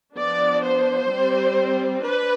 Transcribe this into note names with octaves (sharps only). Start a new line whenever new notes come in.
F3 B3 D4 D5
C5
G3 C4
D4 B4